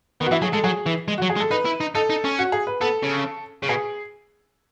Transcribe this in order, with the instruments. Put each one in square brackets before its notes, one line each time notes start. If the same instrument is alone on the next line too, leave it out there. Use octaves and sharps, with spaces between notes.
[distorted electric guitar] D#3 [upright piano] B3
[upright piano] F#4
[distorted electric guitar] E3 [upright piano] E4
[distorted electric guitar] F#3 [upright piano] G#4
[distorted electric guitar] G#3 [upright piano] A4
[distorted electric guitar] F#3 [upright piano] G#4
[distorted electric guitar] E3
G#3
[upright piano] F#4
[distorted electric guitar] F#3
[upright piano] G#4
[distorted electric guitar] G#3
[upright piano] A4
[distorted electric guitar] D#4 [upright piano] B4
[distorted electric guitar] E4
D#4
[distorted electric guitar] D#4 [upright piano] A4
[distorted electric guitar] D#4
C#4
[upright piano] F#4
G#4
B4
[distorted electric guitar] B3 [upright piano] A4
[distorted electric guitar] C#3
C#3
[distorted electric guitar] B2 [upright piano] G#4